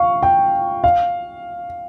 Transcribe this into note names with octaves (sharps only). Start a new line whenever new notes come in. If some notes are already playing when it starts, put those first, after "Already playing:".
Already playing: F5 C#6
G5
F5